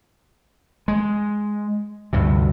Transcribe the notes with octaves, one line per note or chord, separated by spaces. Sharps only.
G#3
D2 G2 C3